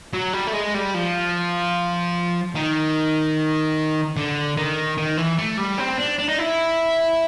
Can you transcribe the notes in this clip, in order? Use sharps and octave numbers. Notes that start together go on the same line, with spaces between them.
F#3
G3
A3
G#3
G3
F3
D#3
D3
D#3
D#3
E3
A3
G3
C4
D4
D4
D#4
E4